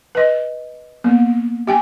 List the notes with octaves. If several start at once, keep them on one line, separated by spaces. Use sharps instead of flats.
B4 D#5
A#3 B3
G4 G5 G#5